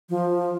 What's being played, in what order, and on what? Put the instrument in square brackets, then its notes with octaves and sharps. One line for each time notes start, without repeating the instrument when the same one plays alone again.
[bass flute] F3
[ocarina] F4